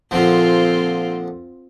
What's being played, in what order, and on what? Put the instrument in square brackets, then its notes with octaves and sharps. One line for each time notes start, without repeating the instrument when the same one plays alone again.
[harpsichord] A#2 D3 F3 [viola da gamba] C4 F4